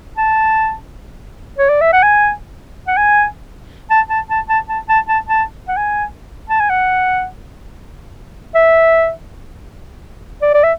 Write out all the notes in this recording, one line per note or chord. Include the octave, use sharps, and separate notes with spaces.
A5
C#5
D5
E5
F#5
G#5
F#5
G#5
A5
A5
A5
A5
A5
A5
A5
A5
F#5
G#5
A5
G#5
F#5
E5
D5
D5
E5